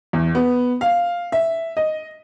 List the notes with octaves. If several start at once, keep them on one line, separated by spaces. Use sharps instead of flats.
E2
B3
F5
E5
D#5